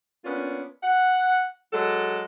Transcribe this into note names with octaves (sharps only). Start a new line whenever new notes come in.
A#3 B3 C#4 D4 F4
F#5
F#3 G#3 A4